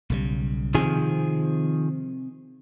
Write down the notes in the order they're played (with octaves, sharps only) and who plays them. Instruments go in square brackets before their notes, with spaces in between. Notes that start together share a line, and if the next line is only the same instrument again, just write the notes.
[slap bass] B1 C#3 G3
[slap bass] C3 C4 [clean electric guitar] D#3 F3 G#4